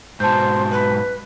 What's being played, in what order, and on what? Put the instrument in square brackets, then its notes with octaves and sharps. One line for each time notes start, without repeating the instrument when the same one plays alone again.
[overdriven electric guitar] G#2 B2 [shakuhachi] C5 [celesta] A5 G6
[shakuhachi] B4